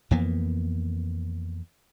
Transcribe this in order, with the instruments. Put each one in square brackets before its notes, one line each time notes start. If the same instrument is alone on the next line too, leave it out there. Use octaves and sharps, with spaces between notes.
[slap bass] F2 E3 A#3 B3